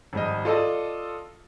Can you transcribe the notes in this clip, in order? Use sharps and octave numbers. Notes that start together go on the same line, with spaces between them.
G#1 G3 D#5
F4 A4 D5 D#5